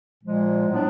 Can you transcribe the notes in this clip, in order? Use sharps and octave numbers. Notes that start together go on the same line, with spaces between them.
A#2 F3 G#3
A2 F#3 B3 D4